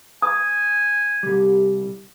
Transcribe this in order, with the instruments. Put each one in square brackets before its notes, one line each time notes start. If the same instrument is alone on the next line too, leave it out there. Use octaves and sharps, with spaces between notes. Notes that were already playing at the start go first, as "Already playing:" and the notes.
[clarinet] G#5 [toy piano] D#6
[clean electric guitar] C2 G3